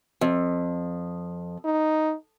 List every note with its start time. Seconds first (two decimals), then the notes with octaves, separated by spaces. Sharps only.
0.21 F2
1.65 D#4